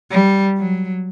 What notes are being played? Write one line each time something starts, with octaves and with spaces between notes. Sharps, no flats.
G3
F#3